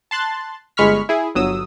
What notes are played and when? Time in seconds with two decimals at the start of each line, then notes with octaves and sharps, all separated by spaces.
0.11 A5 C6 F#6 A6
0.77 G1 G#3 B5 C#6 F6 B6
1.09 E4 G#4
1.35 G1 F#3 D#6 E6